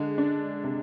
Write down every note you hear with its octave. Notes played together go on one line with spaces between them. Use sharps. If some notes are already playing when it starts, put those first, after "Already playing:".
Already playing: D3 G#3
D4
C3